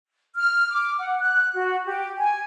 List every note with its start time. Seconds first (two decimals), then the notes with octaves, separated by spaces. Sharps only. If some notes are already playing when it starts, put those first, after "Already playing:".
0.36 F6
0.71 D6
0.99 F#5
1.20 F#6
1.54 F#4
1.86 G4
2.19 G#5